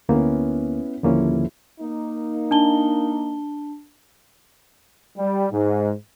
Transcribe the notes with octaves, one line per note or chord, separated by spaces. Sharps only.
D2 A#3 B3 C#4 E4
D#1 D3 F3 A#3 C#4 E4
A#3 D#4
D4 A5 G7
G3
G#2